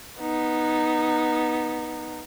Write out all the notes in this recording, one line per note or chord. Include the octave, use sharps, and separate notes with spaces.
B3 D#4